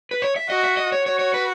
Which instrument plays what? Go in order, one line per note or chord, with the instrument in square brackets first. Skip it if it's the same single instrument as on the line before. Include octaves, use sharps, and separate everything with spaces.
[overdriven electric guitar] B4
C#5
E5
[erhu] F#4 [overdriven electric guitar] D#5
[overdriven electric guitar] E5
D#5
C#5
[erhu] F#4 [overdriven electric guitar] C#5
[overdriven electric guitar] C#5
B4